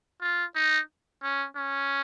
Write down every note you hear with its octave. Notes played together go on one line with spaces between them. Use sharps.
F4
D#4
C#4
C#4